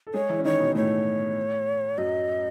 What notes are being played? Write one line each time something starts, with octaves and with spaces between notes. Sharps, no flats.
A4
G#3 G#4 C#5
E3 E4
C#4
D#3 D#4 C#5
B2 B3
A2 A3 C#5
F#2 F#3 D#5